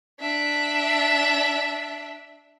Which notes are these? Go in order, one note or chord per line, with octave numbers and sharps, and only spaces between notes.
D4 E5